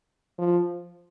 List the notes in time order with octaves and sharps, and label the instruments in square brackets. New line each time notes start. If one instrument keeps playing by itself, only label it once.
[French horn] F3